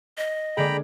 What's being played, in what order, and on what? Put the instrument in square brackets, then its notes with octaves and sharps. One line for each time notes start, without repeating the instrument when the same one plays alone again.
[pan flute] D#5
[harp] D3 G#3 A#3 [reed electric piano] G#4 D5 [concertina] G5 A#5 B5